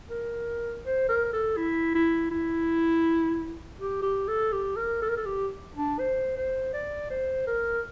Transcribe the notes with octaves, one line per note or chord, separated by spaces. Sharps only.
A#4
C5
A#4
A4
E4
E4
E4
G4
G4
A4
G4
A#4
A4
A#4
A4
G4
D4
C5
C5
D5
C5
A#4